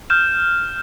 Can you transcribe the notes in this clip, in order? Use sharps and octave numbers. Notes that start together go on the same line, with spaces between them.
F6 G6 E7